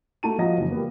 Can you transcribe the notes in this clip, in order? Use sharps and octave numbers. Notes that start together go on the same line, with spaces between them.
A3 E4 F#4 A5 A#5 D#7
F3 F4 F#4 D#5 A#5 A#6
F#1 E3
G3 A#3 B3